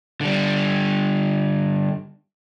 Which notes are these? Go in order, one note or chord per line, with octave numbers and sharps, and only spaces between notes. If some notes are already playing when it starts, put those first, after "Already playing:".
D3 G3